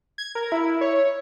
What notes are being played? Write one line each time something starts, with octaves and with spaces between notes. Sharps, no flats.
G#6
A#4
E4
C#5